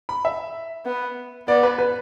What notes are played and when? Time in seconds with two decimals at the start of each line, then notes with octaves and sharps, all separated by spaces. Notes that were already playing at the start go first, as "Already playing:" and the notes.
0.09 B5
0.25 E5
0.86 B3
1.48 B3 D5
1.63 B4
1.79 B4